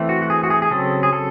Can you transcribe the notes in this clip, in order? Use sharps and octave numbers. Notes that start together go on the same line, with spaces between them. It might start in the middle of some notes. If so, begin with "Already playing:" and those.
Already playing: E3 A3 C4
F#4
F#4
G#4
F#4
G#4
G#4
C#3 F#3 C4 A4
G#4
A4